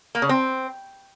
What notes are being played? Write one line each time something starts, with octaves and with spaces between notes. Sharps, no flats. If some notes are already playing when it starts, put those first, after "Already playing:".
A#3
C#3
C4